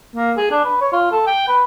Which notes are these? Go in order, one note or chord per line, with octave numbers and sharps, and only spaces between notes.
A#3
G#4
D4
B4
C#5
F4
A4
G5
B4